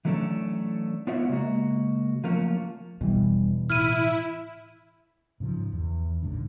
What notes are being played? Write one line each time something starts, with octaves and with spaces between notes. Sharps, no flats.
E3 F#3 A3 C#4 D4
B3 F4 F#4 C#5 D5 E5
C#3 G#3 A#3 F#4
F3 F#3 A3 A#3 C#4 F4
E1 B2 E3 G3
A2 E4 F6 D#7
G#2 C#3 F3
E2
A#1 G#2 D3